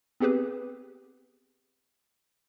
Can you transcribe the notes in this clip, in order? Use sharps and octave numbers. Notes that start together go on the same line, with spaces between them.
B3 C4 G4 G#4 B4